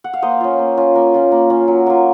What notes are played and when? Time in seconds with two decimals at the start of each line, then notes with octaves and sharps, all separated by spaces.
0.04 F#5
0.13 F5
0.22 A#3 C5 D#5
0.40 C#4 F4
0.59 A#3
0.77 C#4 F4
0.95 A#3
1.14 C#4 F4
1.32 A#3
1.50 C#4 F4
1.68 F#3
1.87 A#3 F4